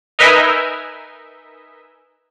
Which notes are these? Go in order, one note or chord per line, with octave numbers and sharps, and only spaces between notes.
D#4 A#4 B4 D#5 E5 G#5